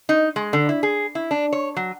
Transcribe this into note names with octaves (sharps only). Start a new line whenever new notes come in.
D#4
G#3
D3
E4
G#4
E4
D4
C#5
F#3